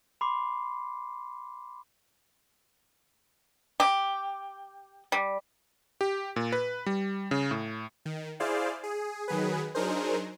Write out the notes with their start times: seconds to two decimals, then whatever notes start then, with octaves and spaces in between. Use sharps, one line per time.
0.21 B5 C6 D6 C7
3.80 G4
5.12 G3
6.01 G4
6.36 A#2
6.52 B4
6.86 G3
7.31 C#3
7.51 A2
8.06 D#3
8.40 E4 G#4 C5 D5 F5
8.84 G#4
9.28 D#3 F#3 G#4 B4
9.75 F#3 D4 D#4 G#4 A#4 C5